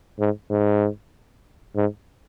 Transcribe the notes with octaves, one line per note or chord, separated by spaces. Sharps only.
G#2
G#2
G#2